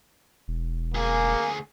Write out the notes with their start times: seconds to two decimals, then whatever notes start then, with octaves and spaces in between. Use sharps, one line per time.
0.48 E1
0.94 D2 A#3 G#4